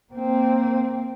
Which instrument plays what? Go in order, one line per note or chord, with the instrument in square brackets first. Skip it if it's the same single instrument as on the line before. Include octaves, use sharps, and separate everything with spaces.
[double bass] A#3 C4